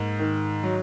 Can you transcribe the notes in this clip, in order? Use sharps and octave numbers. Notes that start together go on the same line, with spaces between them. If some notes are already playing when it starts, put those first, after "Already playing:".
Already playing: G#2 A#3
D#3
F#3